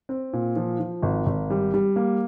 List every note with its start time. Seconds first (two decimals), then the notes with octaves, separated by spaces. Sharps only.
0.09 C4
0.33 A#2
0.56 F3
0.80 F3
1.03 G#1
1.26 G#1
1.50 G3
1.74 G3
1.96 A#3